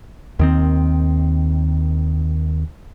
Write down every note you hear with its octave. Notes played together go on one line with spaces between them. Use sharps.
D#2 D#3 C4